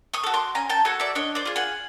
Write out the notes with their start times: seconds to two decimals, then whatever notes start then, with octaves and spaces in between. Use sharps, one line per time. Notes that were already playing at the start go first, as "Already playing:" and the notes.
0.14 C#6 D#6
0.24 F#4 A4
0.34 C6 D6
0.55 C#4 G#5 A#5
0.69 G5 A5
0.85 F#4 A4 F#5 G#5
1.00 D5 E5
1.15 D4 C#5 D#5
1.35 C5 D5
1.45 F4 G#4
1.56 F#5 G#5